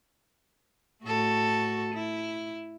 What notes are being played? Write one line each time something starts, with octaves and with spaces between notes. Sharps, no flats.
A2 F#4 A4
E4